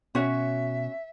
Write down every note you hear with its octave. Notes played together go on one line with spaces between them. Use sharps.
B2 C#4 F#4 C#5 E5